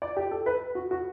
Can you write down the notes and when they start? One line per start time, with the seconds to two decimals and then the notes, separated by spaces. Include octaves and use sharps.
0.02 D5
0.17 G4
0.31 A4
0.46 B4
0.75 F#4
0.91 F#4